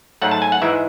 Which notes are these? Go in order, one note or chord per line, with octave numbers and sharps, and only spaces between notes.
G#2 F#3 A3 F#5
A5
G#5
F#5
G#2 E3 G#3 E5